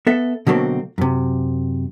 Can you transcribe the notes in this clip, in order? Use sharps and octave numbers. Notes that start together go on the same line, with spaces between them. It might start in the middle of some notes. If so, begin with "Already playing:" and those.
B3 A4 E5
B2 D3 F#3 A3 A#3 C4
F#2 C3